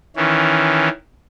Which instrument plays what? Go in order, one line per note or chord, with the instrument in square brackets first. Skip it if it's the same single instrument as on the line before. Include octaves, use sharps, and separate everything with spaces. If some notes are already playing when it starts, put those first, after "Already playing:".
[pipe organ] D#3 E3 C#4